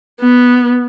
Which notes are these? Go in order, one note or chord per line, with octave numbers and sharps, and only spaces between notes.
B3